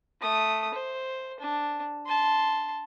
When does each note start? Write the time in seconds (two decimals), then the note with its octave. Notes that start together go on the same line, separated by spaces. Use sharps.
0.21 A3 D#6
0.74 C5
1.40 D4
2.07 A5 C6